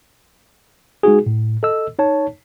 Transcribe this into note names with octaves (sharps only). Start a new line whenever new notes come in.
G#3 D#4 F#4 G#4
A2
A4 D#5 E6
D#4 C#5 A5